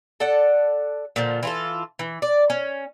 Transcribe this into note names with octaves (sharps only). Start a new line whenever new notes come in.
A4 D5 F#5
A#2 D3 F3
E3 F4 A4
E3
D5
C#4